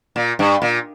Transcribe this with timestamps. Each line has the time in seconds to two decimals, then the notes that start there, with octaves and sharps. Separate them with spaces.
0.16 A#2
0.39 G2
0.62 A#2